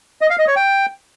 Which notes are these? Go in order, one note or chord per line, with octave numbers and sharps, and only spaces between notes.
D#5
F5
D#5
C#5
G5